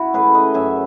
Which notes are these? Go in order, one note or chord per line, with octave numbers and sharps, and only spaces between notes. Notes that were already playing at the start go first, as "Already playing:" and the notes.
Already playing: E4 F#4
E3 A3 C#4 G#4 B4
B4 D#5
F#2 E5 G#5